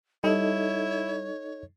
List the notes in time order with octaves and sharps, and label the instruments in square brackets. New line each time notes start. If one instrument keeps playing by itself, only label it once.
[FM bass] G3 [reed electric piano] D#4 A4 D#5 [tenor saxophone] E4 [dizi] C#5